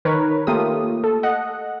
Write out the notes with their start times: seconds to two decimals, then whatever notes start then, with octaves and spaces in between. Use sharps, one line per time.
0.05 D#3 A#4 B4 C#5
0.47 A3 A#3 F4 G4 D#6
1.04 A4
1.23 D#5 F#5